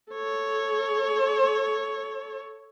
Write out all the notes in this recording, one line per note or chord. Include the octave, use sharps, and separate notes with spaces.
A4 C#5